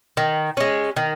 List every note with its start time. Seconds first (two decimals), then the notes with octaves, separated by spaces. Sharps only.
0.17 D#3
0.57 G#3 C#4
0.96 D#3